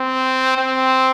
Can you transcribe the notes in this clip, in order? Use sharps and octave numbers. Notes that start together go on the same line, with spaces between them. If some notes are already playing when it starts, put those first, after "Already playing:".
Already playing: C4
C4